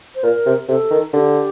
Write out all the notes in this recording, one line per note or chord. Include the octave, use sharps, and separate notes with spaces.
C5
A#2 A#4
C3
C3 A4
D#3
D3 G4